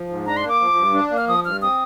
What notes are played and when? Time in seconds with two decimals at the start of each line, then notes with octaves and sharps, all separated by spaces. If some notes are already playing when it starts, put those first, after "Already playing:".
Already playing: F3
0.09 G#2
0.26 D4 A#5
0.37 C6
0.43 A#3
0.49 D6
0.60 F3
0.77 G2
0.94 D4
1.11 A#3
1.17 F6
1.28 F3 D#6
1.45 G2 F6
1.62 C4 D#6